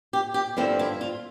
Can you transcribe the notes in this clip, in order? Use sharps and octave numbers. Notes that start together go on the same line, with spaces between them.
G4
G4
G2 D3 F3 C4 E4
E4
F4